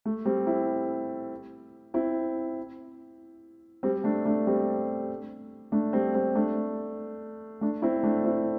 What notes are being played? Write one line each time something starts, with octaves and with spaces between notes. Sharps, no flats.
A3
G3 C4
C4 E4
C4 E4
G3 C4
A3 D4
A3 D4
G3 C4
A3 D4
G3 C4
G3 C4
A3 D4
A3 D4
C4 E4
A3 D4
C4 E4